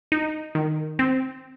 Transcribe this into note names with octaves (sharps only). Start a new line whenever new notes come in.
D#4
D#3
C4